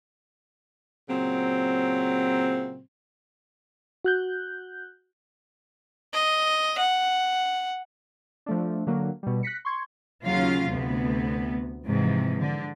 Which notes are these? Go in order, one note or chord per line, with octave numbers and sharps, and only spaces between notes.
A#2 C#3 F#3 C4
F#4 F#6 G6
D#5
F#5
F3 A3 D4
D3 F#3 A#3
B2 G3
F#6 A#6 B6 C#7
C6 C#6 G#6
D#2 C#3 F#3 C#4 F4 F5
D2 C3 B3
G#2 C3 E3 F3
D3